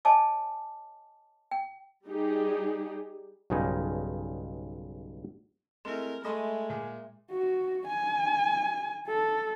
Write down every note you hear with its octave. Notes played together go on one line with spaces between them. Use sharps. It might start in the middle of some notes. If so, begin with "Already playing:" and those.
C#5 D#5 G#5 A5 D6
G5
G3 D#4 G4 G#4
B1 G2 C#3 G#3 D#4
G#3 A3 C4 E4 A#4
G#3 A3 D#5 E5 B5 C6
A#2 G#4
F#4
G#5
A4